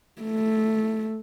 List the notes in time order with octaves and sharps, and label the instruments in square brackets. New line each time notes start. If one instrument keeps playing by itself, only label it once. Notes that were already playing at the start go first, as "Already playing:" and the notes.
[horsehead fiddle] A3